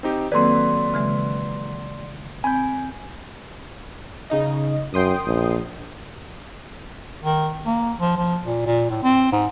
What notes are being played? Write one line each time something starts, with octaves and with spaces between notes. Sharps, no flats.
C4 D#4 G4
D#3 F#3 A#3 C4 A4 B4 D5 C6
C#3 E3 G#3
C4 G#5 B5 G6
C#3 D#4 D#5
F#2 G5 C6 D#6
A#1
D#3
A#3
F3
F3
A#2
A#2
A2
C4
G#2